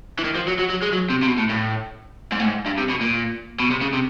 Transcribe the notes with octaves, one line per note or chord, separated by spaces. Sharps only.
E3
D#3
F3
F#3
F#3
F#3
G#3
F#3
C3
C3
B2
A2
A2
G#2
A2
G#2
G2
C3
B2
A#2
B2
C3
C#3
C3